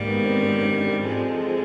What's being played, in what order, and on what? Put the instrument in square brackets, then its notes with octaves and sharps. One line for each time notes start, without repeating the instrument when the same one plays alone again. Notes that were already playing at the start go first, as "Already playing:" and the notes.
Already playing: [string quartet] G#2 D#3 G3 [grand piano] A#3
[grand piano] B3
C4
C#4
D4
G4
[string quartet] F3 G#3 C4 [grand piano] A4
[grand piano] A4
G#4